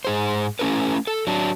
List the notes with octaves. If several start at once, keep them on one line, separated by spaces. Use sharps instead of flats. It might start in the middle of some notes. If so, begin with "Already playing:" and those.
G#2 G#4 C5
A3 C#4 E4 A4 B4
A4
F#3 D4